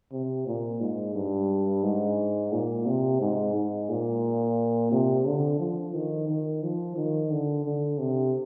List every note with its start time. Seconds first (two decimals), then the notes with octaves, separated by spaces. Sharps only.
0.12 C3
0.47 A#2
0.80 G#2
1.15 G2
1.83 G#2
2.53 A#2
2.86 C3
3.21 G#2
3.54 G#2
3.89 A#2
4.91 C3
5.25 D3
5.59 F3
5.95 D#3
6.28 D#3
6.63 F3
6.96 D#3
7.31 D3
7.65 D3
7.99 C3